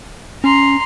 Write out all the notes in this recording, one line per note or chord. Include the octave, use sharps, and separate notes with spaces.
C#4 A#5 C6